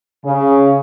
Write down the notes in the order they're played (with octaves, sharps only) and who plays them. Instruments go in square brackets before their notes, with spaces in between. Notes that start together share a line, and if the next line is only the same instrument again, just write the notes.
[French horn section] C#3